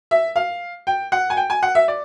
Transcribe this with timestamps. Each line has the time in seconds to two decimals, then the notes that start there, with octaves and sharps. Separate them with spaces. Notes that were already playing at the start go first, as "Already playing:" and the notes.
0.11 E5
0.36 F5
0.87 G5
1.12 F#5
1.30 G#5
1.37 G5
1.50 G#5
1.63 F#5
1.75 E5
1.88 D5